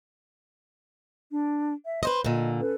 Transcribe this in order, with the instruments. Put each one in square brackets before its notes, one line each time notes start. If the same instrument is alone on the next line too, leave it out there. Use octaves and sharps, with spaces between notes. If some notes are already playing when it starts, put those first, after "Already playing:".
[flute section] D4
E5
[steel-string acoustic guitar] B4 C5 D#5 [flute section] C6
[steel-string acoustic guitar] A#2 D3 [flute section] D#5
[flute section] C#4 A4 B4